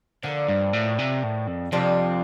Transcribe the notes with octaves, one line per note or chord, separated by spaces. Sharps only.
D3 F3 A#3 D4
G2
A2
C3
A2
F2
F2 C3 G3 D4 F4